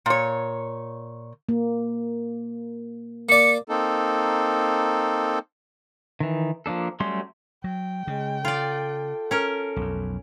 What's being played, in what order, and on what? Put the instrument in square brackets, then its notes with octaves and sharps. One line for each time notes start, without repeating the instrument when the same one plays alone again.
[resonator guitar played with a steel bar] A#2 C#5
[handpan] A#3
[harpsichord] A#3 D5 [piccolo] C#7
[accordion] A#3 C4 D#4 A4
[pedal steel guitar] D#3 E3
F3 A#3 D4 A4
F#3 G3 A3 C#4 C6
[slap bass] F#3 [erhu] G5
[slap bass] C#3 [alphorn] G#3
[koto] F4 D5 [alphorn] A4
[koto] C#4 A#4
[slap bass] B1 F2